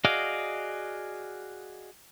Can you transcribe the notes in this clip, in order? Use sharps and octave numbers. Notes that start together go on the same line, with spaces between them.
F#4 G#4 D5 D#5 F5